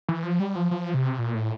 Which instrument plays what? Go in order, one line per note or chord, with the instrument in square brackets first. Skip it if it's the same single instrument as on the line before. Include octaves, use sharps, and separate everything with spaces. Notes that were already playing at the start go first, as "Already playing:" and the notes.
[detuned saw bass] E3
F3
G3
F3
F3
C3
A#2
A2